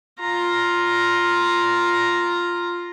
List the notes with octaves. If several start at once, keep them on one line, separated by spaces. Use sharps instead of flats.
F4 A#5